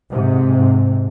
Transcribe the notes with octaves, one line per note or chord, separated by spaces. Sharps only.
G#2 C3